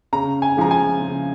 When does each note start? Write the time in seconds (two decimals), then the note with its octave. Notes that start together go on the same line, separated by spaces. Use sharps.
0.13 C#3 A#5
0.42 G#5
0.57 F3 G#3 A#5
0.71 G#5
1.00 C#3